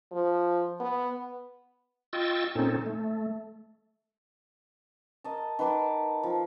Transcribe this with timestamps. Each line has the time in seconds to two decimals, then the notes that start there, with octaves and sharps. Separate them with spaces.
0.12 F3
0.80 B3
2.13 F4 D#5 G5 C#6 E6 A6
2.55 A#2 C4 C#4 D#4 A4
2.86 A3
5.24 A#4 D#5 A5
5.59 D#3 B4 A5 D6
6.23 F3